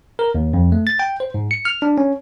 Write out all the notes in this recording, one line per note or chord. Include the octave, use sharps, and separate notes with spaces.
A#4
D#2
F2
A3
A6
G5
C5
G#2
C#7
F6
D4
C#4